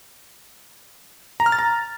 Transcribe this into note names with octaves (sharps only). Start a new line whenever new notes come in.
A#5
F6
A6
A#5